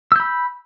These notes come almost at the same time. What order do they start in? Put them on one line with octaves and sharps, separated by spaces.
E6 G6 B5